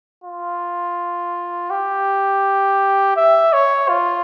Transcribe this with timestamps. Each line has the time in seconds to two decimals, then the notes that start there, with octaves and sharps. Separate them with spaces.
0.24 F4
1.70 G4
3.16 E5
3.53 C#5
3.89 F4